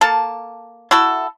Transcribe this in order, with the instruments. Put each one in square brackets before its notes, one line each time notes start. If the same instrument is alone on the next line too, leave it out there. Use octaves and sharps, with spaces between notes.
[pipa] A#3 A4 A5
E4 F#4 A4